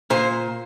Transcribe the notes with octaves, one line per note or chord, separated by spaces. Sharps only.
A#2 C5